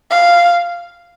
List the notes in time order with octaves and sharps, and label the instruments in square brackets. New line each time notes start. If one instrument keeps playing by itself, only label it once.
[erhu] F5